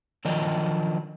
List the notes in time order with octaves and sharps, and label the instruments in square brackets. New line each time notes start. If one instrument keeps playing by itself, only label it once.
[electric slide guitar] D3 D#3 F3 F#3 D4 D#5